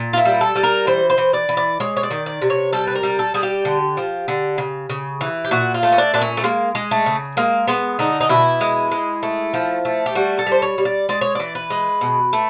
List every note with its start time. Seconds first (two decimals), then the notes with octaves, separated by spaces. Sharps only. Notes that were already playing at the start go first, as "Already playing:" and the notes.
Already playing: A#2
0.13 F4
0.17 E4
0.25 G3
0.41 A4
0.55 G3
0.63 A#4
0.87 E3 C5
1.10 C5
1.18 E3
1.33 D5
1.49 E3
1.57 D5
1.80 G#3 C#5
1.97 C#5
2.03 D5
2.11 D#3
2.26 D5
2.42 C3
2.50 C#5
2.73 G3 A4
2.87 B4
2.95 A#4
3.03 G3
3.19 A4
3.34 G3 G#4
3.43 G4
3.65 D3
3.97 F3
4.28 D3
4.58 C#3
4.89 C#3
5.21 E3
5.44 G4
5.51 A#2 F#4
5.74 F4
5.83 A3
5.92 C#4
5.98 D4
6.14 A#2 D4
6.21 C#4
6.37 A3
6.44 G#3 A#3
6.75 G#3
6.91 A3
7.06 C#3
7.37 G#3 A#3
7.68 G#3 B3
7.99 D3 D#4
8.21 D#4
8.29 B2 E4
8.61 G#3
8.91 G#3
9.23 A3
9.54 F3
9.85 A3
10.06 G4
10.15 G3 F#4
10.39 A4
10.46 G3
10.52 C5
10.62 C#5
10.78 G3
10.85 D5
11.09 G#3 D5
11.21 C#5
11.35 E3 D5
11.55 B4
11.70 G#3
12.01 B2
12.33 A3